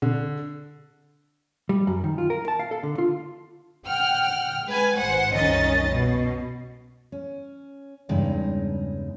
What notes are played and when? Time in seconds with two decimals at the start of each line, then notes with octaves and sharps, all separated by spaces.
0.02 D3
1.69 G3
1.87 F#2
2.04 D#3
2.18 F4
2.30 A#4
2.48 A5
2.60 F5
2.71 A4
2.83 D3
2.98 F4
3.87 F#5 G5 F6
4.66 G#3 B4 G#5
4.98 G#1 C5 F#5
5.35 C2 F#2 D#3 C#4 D#5 A6
5.93 B2
7.12 C#4
8.09 E2 G2 C#3 G#3 D#4